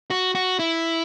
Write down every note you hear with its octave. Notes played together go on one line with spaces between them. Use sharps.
F#4
F#4
E4